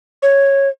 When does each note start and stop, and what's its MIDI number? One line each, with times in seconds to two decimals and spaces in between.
0.23 0.69 73